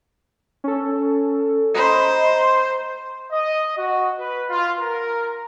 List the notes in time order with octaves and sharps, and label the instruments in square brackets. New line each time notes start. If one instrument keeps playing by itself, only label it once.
[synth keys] C#4 A4
[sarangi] C5 [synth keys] D#5 A#5 B5
[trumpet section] D#5
F#4
B4
F4
A#4